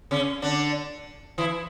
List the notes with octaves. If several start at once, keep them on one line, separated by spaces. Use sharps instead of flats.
C#3 C#4
D3 D4
E3 E4